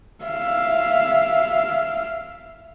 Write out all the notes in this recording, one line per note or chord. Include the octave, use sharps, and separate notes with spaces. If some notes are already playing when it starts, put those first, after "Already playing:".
E5 F5